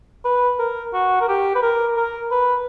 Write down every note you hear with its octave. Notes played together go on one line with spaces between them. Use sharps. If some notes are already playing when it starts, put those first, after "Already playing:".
B4
A#4
F#4
A#4
G4
B4
A#4
A#4
B4